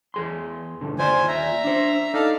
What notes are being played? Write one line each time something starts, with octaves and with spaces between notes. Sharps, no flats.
E2 G#4 C6
D2 G2 D3
D#2 F4 C5 D5 G#5
E5 A#5
D4 C5
D#4 A4 D5 F5